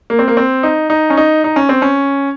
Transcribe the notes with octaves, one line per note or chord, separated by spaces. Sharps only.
A#3
C4
A#3
C4
D#4
D#4
C#4
D#4
D#4
C#4
C4
C#4